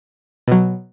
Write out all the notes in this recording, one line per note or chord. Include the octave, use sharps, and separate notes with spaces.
B2 F#3